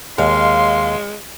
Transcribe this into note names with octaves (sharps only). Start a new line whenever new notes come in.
D#2 G#3 F5 C6